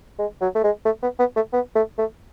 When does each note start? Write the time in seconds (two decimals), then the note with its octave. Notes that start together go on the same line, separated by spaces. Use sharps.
0.19 G#3
0.41 F#3
0.55 A3
0.64 G#3
0.85 A3
1.03 B3
1.19 B3
1.36 A3
1.53 B3
1.75 A3
1.98 A3